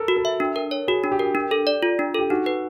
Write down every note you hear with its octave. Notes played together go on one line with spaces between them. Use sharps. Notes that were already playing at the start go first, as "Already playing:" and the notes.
Already playing: A4 A#4
F#4
A4
E5
D4
A#4
C#5
F#4 G#4
D4
G4
A#4
D4
A4
D5
F4
D4
G4 A4
D#4 F#4
B4